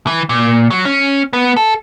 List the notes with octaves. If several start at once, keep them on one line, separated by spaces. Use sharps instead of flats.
E3
A#2
F#3
C#4
B3
A4